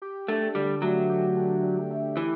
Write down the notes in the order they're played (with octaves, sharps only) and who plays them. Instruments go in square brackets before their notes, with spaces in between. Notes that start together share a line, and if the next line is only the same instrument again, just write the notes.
[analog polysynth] G4
[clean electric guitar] A3 [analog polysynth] D4
[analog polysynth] D3 [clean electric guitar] G3
[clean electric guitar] F#3 [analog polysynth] A3
[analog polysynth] G4
D4
D3
A3
[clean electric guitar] E3 [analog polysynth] G4